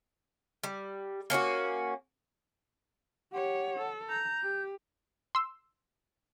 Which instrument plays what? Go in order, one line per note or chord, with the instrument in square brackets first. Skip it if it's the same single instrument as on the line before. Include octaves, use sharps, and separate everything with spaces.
[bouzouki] G3
A#3 C#4 D4 F#4
[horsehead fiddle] G4 C#5 [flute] F#5
[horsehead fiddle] A4
[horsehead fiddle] A#5 [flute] G6
[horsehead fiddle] G4
[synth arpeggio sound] C6 E6